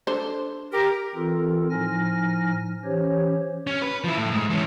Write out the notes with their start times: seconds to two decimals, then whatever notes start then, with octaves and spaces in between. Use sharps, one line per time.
0.07 D4 A4 C5
0.72 G4 A#4
1.15 E3 C4 F4 A4 A#4
1.71 A2 F3 D#4 G#5 F6 A#6
2.84 E3 C#4 G4 C5 C#5
3.67 C#4
3.82 B4
4.04 F3 E4
4.17 A2
4.32 G#2
4.50 E3 C#4